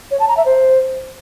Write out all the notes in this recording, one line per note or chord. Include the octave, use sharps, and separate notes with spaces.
C#5
A5
A#5
E5
C5